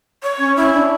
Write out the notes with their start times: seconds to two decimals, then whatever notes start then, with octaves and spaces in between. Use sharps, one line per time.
0.23 C#5
0.39 C#4
0.57 E4
0.73 D4